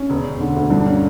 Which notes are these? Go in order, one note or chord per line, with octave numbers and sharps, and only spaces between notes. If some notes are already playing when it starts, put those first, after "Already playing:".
Already playing: C#4
E1
E1
D3
D2
G2 D4
A#3 C#4